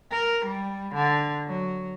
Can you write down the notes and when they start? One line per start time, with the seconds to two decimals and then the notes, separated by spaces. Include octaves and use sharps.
0.11 A#4
0.45 G3
0.95 D3
1.47 F#3